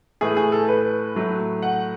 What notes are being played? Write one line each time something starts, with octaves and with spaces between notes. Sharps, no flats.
A2 E3 A3 G#4
G#4
A4
B4
A2 F#3 A3
F#5